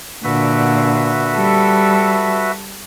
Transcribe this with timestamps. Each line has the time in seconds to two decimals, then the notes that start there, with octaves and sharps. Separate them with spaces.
0.24 A#2 D3 F#4 B4 E5
1.37 G3 A4